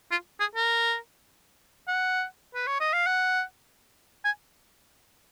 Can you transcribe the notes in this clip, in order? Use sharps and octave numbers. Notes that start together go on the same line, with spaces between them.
F4
G#4
A#4
F#5
B4
C#5
D#5
F5
F#5
G#5